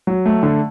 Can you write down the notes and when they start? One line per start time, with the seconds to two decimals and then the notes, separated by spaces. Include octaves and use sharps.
0.07 F#3
0.26 A3
0.43 D3